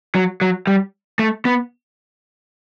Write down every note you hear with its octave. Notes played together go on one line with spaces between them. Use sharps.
F#3
F#3
G3
A3
B3